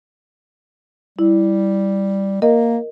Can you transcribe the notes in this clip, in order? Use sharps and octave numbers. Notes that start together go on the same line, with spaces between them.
G3 E4
A#3 A#4 D#5